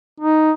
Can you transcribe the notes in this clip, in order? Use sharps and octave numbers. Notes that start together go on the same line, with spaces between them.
D#4